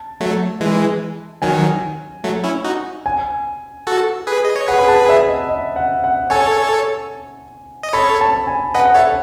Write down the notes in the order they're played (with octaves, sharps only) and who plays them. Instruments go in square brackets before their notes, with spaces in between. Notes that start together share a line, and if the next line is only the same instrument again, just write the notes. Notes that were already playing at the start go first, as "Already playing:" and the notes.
Already playing: [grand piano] A5
[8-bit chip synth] F#3 A3
E3 G#3
[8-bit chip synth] D#3 F#3 [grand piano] G#5
[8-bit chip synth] F#3 A3
C#4 E4
D#4 F#4
[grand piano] G#5
[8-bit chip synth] F#4 A4
G#4 B4
D#5
C#5
[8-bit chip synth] G#4 B4 [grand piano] F#5
[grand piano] B5
A5
E5
D#5
D#5
F#5
F#5
[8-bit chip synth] A4 C#5 [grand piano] G#5
[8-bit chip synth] D#5
[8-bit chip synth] A4 C#5 [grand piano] B5
[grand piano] A5
G#5
[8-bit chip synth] B4 D#5 [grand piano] F#5
[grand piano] F#5
[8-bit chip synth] A4 C#5 [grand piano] E5